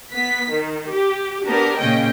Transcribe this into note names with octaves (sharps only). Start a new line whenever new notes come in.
B3 B6
D#3
G4
B3 D4 G4 A#4
A#2 C#3 C#4 D#5 G5